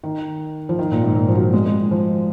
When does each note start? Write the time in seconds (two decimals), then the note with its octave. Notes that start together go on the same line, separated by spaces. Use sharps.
0.04 D#3
0.69 F3
0.79 D#3
0.92 A#2
1.04 G#2
1.15 A#2
1.28 F3
1.35 F#3
1.54 G#3
1.66 G#3
1.91 F3